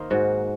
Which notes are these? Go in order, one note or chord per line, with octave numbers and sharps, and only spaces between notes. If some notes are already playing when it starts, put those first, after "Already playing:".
Already playing: D#3 A#3 C5 D#5
G#2 F#4